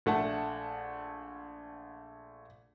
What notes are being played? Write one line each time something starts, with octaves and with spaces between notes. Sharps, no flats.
A#1 A3 F#5 A5